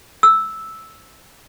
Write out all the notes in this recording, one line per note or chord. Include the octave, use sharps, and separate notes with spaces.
E6